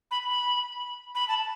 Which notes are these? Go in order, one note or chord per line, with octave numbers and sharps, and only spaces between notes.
B5
B5
B5
A5